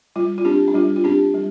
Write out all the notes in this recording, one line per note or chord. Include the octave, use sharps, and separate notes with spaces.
G3 F4
F4
C4 D4 G4
D4
G3 F4
F4
C4 D4 G4
G3